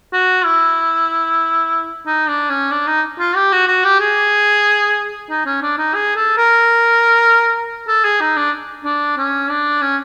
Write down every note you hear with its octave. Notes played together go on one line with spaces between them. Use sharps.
F#4
E4
D#4
D4
C#4
D4
D#4
F4
G4
F#4
F#4
G4
G#4
D#4
C#4
D4
D#4
G#4
A4
A#4
A4
G#4
D#4
D4
D4
C#4
D4
C#4